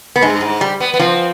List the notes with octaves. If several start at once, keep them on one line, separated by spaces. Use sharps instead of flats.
B3
G2 G#3
G#2
G3
B3
B3
F3 C4